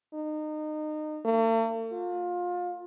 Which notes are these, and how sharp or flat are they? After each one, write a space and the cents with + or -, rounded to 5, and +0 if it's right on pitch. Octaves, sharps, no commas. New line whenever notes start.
D#4 -25
A3 +45
F4 +25